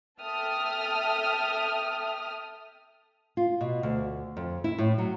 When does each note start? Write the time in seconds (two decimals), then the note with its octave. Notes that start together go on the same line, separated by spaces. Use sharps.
0.21 A4 E5 G5 A5 D#6 F6
3.37 F4
3.61 B2
3.83 D2
4.37 F2
4.64 E4
4.78 A2
4.98 F#3